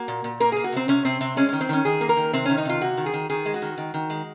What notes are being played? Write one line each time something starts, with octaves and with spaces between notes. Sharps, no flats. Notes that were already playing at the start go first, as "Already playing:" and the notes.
Already playing: A#3 F#4
A#2
A#2
A#3 A#4
A#3 G#4
F#4
C3 C4
C3 C#4
C3 C4
C3 C4
G#3 C#4
D#3 C#4
C4
D#3 C#4
D#3 G#4
A#3
A#4
D#3
C3 C4
D#3 C#4
D#4
C3 F4
C3 F#4
D#3
G#4
D#3
D#3 G#4
G#3
F#4
D#3
D#3
D#3
G#3